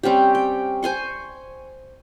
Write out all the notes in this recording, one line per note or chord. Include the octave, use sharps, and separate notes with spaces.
G3 C4 C#4 G4
G5
C5 G#5 C6 C#6